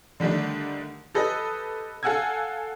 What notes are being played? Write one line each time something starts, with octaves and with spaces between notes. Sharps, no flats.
D3 D#3 G3 A3 D4
G4 A4 B4 D#5
A4 F5 F#5 G#5 E6 G#6